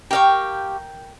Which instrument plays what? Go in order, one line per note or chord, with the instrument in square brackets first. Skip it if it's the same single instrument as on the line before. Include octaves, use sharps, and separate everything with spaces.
[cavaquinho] G4 F5 C#6 [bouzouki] A#4 G5